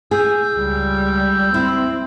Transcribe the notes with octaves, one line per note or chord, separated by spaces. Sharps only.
G#4 E6 G6
C#2 G3
C4 E4